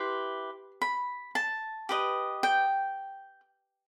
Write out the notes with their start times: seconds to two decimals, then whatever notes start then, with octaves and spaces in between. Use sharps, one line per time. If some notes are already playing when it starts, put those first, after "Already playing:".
Already playing: E4 G4 B4 C6
0.82 B5
1.35 A5
1.89 G4 B4 D#5
2.43 G5